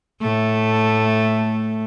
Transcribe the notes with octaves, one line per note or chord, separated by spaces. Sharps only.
A2 A3